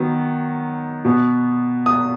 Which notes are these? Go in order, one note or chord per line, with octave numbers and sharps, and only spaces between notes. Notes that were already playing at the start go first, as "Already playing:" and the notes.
Already playing: D#3 F#3 B3
B2 B3
D#6